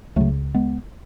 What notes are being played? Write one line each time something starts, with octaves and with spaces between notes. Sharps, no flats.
C#2 C#3 F#3 A3
G#3 B3